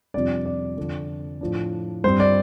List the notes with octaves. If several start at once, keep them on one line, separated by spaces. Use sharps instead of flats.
F2 C3 G3 D4 D5
D5
F2 D3 F3
A2 F3 D4
G2 G3 C4 C5
D5